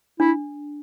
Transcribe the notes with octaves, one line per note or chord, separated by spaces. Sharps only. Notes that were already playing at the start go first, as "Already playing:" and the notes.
D4 E4